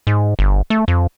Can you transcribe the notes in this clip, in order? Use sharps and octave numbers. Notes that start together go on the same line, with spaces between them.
G#2
G1
A3
F2